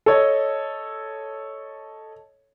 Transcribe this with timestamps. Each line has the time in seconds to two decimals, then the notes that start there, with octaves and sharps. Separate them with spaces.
0.06 A4 C#5 D#5